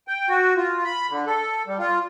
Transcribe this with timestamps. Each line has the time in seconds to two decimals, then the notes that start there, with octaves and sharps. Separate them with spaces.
0.08 G5
0.29 F#4
0.57 F4
0.85 B5
1.10 D3
1.27 A4
1.67 G3
1.79 F4